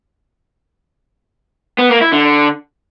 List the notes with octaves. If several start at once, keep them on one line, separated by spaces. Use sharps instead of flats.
B3
A#3
E4
D3